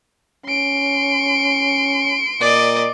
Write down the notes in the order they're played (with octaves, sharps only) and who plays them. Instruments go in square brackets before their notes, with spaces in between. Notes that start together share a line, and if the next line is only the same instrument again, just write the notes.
[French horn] C#4 [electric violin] C6 D7
[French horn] A#2 [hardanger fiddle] D5 D#5